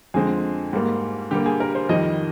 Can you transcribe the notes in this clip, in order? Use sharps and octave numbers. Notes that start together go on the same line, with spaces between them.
F2 D3 G#3 C4 G#4
G#2 G3 A#3
D3 G3 A#3 G4
G#4
A#4
C5
F2 D#3 G3 D#5